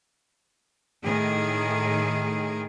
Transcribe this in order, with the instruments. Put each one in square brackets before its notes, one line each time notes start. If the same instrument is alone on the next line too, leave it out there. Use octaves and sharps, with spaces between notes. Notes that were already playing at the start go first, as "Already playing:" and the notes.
[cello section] A2 D#3 G#4